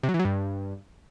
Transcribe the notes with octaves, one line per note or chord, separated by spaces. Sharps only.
C3
F#3
E3
F#3
G2